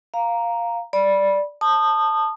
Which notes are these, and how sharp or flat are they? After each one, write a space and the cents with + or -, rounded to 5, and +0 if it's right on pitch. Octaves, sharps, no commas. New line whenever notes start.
F5 +0 A#5 +0
D5 -5 B5 -15
A5 +5 D#6 -25